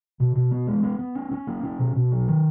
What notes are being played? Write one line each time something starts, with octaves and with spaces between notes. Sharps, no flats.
B2
B2
B3
G#3
B3
B3
C#4
C#4
A#3
C#4
B2
B2
F#3
D#3